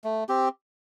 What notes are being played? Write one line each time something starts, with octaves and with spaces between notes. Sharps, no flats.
A3
C4 G4